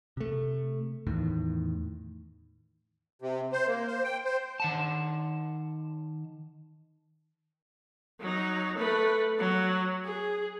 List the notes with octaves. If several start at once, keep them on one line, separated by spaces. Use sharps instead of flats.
C3 A3
E2 A2 D#3
C3
C5
A#3
C5
G5
C5
D#3 F#5 A5
F#3 D#4
A3 B4
F#3
G#4